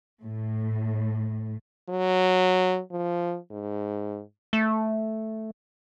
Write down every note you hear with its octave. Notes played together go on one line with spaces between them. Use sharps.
A2
F#3
F3
G#2
A3